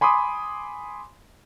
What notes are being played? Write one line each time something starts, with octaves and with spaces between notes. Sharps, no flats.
G#5 B5 C6 D6 D#6